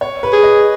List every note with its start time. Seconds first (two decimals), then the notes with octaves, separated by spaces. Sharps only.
0.01 C#5
0.23 B4
0.33 G#4
0.43 D#5